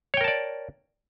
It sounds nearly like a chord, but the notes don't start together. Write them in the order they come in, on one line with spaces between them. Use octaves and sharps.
C#5 G5 A#4 A5 D5